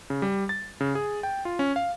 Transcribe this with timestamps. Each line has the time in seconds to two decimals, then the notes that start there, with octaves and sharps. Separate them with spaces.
0.10 C#3
0.22 G3
0.49 A6
0.81 C#3
0.95 G#4
1.23 G5
1.45 F4
1.59 C#4
1.76 F5